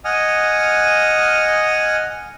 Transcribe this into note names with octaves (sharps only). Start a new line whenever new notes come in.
D#5 F#5 G#5 D#6 F6